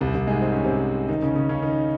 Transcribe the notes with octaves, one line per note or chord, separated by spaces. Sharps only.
C2 C3
C2 C3
G#2 G#3
C4
C#4
C3 C4
D#3 D#4
C#3 C#4
C#3 C#4
C#3 C#4
D#3 D#4